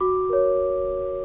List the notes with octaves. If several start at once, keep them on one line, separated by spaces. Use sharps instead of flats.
F#4 D6
A#4 C#5